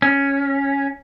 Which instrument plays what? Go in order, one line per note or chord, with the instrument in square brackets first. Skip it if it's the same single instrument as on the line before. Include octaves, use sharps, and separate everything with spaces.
[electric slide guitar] C#4